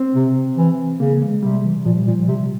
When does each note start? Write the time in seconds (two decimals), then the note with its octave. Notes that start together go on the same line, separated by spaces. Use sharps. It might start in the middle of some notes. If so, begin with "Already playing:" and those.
Already playing: C4
0.14 C3
0.57 E3
1.00 C#3 A#3
1.22 G#3
1.43 C3 G3
1.65 E3
1.85 A#2 F3
1.97 G3
2.07 A#2 F3
2.28 C3 G3